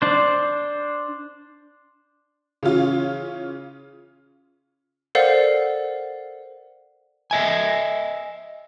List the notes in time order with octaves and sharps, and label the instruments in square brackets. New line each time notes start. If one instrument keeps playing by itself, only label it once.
[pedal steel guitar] D4 C5
[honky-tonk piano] C#3 E3 C#4 F4
[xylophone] A4 A#4 C5 D5 F5 F#5
[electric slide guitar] D#5 E5 G#5